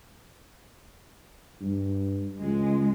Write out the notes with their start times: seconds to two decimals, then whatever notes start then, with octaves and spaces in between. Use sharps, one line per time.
1.61 G2
2.40 C#2 G#3